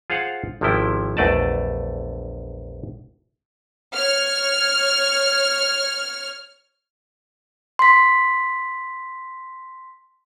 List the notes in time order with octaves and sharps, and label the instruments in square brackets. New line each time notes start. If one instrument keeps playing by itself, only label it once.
[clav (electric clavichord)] F4 G#4 C5 F5 F#5
G#1 C3 F3 C#4 E4 G5
A#1 E2 A3 D5 D#5 A5
[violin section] C#5 F6
[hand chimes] C6 B6